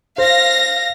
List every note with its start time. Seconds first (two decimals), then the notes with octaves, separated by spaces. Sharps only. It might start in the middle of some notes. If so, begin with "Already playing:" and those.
0.18 C5 F5 A#6